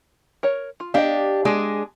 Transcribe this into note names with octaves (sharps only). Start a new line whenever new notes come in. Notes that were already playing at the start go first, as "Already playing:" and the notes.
A#4 C#5
F4
D4 G4 D#5 F5
G#3 D4 G#4